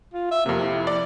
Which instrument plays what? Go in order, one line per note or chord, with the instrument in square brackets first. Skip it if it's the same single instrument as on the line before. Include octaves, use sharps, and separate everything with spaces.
[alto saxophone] F4
E5
[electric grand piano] F2 C3 [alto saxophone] A#3
[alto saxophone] E4
[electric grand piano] D5